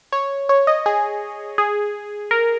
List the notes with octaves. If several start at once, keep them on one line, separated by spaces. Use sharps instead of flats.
C#5
C#5
D#5
G#4
G#4
A#4